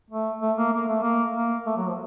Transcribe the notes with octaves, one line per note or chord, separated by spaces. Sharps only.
A3
A3
A#3
A#3
A3
A#3
A#3
A3
F#3
F3